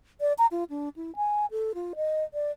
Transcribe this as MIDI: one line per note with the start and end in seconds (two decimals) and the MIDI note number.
0.20 0.33 74
0.38 0.46 82
0.51 0.64 65
0.70 0.89 62
0.96 1.15 64
1.16 1.46 80
1.51 1.72 69
1.75 1.93 65
1.96 2.24 75
2.34 2.51 74